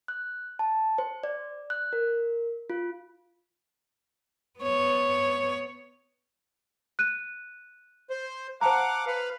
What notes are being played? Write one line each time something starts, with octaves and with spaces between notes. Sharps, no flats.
F#6
A5
C5
D5
F#6
A#4
F4
B3 C#5
F#6 D#7
C5
C5 F5 F#5 A5 A#5 D6
B4 F5